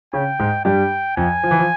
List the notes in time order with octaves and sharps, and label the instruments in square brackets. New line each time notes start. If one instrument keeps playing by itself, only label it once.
[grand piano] C#3 C#4 [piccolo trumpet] G5
[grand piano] G#2 G#3
[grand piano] G2 G3 [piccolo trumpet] G5
[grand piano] F2 F3 [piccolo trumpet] G#5
[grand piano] F3
E3
F3